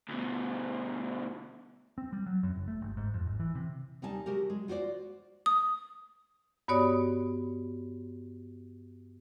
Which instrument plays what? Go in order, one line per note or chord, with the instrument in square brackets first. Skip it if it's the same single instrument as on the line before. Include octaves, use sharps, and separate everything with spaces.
[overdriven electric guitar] D2 B2
[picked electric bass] C4
G3
F#3
F#2
F#1
A3
G1
G#2
F2
G#1
E3
C3
[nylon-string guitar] D#2 C3 G3 D#4 G#5 A5
C3 G#3 F#4 G4 A#4
G#3
F4 F#4 C5 D5
[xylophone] D#6
[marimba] G2 B3 F#4 C#5 D5 D#6